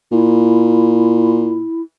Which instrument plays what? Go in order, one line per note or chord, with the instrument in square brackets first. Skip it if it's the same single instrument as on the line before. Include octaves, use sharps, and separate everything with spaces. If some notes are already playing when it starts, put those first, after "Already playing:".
[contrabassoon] A#2 [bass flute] E4